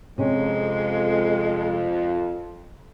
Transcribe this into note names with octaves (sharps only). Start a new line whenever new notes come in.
F2 C3 G#3 C#4